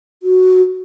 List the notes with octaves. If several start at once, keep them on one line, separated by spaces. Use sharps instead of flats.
F#4